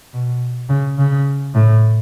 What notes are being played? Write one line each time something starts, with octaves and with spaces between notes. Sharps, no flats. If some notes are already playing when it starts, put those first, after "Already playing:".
B2
C#3
C#3
A2